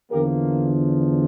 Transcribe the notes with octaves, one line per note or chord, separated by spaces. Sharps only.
E2 D3 F3 A#3 G4 A#4